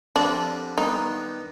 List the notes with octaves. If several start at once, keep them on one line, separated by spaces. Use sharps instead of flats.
F2 D3 G3 C4 D4 F4
G2 D#3 G3 B3 D#4